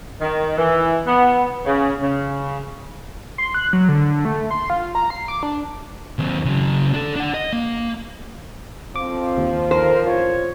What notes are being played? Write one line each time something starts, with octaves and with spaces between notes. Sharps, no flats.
D#3
E3
B3
C#3
C#3
C6
F#6
F#3
D3
A3
C6
F4
A#5
C7
D6
D4
D#2 C4
C#3 F#3
D4 A4
D4 F#5
D#5
A#3
F2 F3 C4 D6
D#2
D#3 A#4 C5
A1 F4 C#5